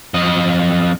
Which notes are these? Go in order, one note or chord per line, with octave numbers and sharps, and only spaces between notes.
F2 D#5